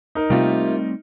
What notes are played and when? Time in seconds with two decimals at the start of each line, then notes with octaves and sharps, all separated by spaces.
0.15 D#4 A#4
0.30 C3 G3 A3 A#3 C4 F4